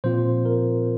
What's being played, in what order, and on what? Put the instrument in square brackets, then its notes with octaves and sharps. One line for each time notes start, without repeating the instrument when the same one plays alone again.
[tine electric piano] A#2 F3 C4 F4 C5
A#4